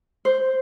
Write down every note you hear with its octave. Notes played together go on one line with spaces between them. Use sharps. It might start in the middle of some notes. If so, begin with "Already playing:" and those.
C5